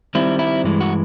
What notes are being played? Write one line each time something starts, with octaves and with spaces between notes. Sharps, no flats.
D#3 G3 C4 E4
E4
G2 E3 G#3
F#4